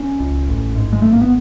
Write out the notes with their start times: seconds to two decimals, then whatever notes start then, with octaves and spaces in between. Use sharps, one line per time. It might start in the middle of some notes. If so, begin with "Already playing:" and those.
Already playing: C#4
0.20 C#2
0.48 A1
0.76 G#2
0.93 G#3
1.02 A1 A3
1.12 A#3
1.21 B3